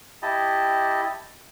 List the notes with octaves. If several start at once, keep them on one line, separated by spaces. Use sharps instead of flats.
E4 G4 D#5 A5